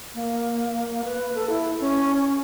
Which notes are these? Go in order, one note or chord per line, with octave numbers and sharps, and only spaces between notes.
A#3
B4
A4
E4
C#4